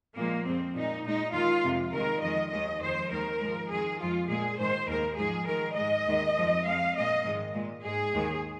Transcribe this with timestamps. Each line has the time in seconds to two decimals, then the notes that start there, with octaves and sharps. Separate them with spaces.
0.15 A#2 F3 G#3 A#3
0.45 F2 F3 G#3 C4
0.73 A#2 G#3 D#4
1.04 A#2 G#3 D#4
1.32 D#2 D#3 G#3 F4
1.62 F2 C3 G#3
1.92 D#2 D#3 G#3 A#4
2.21 F2 D#3 G#3 D#5
2.51 D#2 D#3 G#3 D#5
2.80 F2 D#3 G#3 C5
3.10 D#2 D#3 G#3 A#4
3.40 G#2 F3 G#3
3.69 F2 D#3 G#3 G#4
3.99 F2 F3 G#3 F4
4.28 A#2 G#3 G#4
4.58 G#2 D#3 G#3 C5
4.88 D#2 D#3 G#3 A#4
5.16 G#2 F3 G#3 G#4
5.46 G#2 D#3 G#3 A#4
5.77 G#2 G#3 D#5
6.06 D#2 D#3 G#3
6.36 F2 F3 G#3
6.65 F2 F3 G#3 F5
6.94 A#2 G#3 D#5
7.24 G#2 D#3 G#3
7.54 A#2 G#3
7.83 G#2 G#3 G#4
8.13 D#2 D#3 G#3